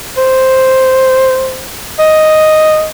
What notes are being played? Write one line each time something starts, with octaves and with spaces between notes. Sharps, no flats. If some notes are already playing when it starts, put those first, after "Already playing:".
C5
D#5